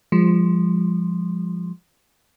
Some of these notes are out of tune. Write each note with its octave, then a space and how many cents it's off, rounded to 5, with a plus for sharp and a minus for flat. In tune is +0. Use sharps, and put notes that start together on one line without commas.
F3 +0 G#3 -35